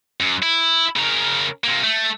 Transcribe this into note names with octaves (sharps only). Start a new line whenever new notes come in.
F#2
E4
C#3 A#4
C3 A#3
A3